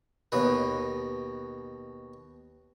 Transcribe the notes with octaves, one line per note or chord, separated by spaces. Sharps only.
D#2 B2 B4